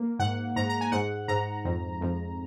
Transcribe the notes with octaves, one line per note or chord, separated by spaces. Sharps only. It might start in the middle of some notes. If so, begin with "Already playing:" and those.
Already playing: A#3
G#2 F#5
G#2 A#5
A#5
G#5
G#2 F#5
G#2 A#5
F2
F2